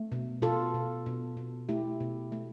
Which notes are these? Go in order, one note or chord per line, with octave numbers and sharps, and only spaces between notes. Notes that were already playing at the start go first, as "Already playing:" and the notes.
Already playing: A3
B2
B2 F4 A4
B2
B2
B2
A3 E4 G4
B2
A3